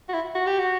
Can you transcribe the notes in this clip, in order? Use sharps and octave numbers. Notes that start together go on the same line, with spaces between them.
F#4
E4
F#4
G4
F#4